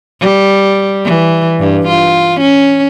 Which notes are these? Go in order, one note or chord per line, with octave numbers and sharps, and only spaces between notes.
G3
E3
G2
F4
C#4